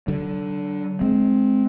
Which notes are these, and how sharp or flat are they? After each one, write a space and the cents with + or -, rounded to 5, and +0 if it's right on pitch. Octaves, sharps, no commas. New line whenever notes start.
D3 +0 F#3 +45
G#3 +30 C4 +0